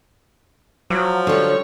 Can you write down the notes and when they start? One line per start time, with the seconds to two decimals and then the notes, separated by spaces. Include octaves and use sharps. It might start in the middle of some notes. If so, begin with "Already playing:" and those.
0.90 F3 F#3
1.27 D3 G3 C#5